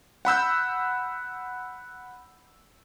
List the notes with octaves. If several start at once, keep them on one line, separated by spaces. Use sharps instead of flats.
F#5 B5 E6 G6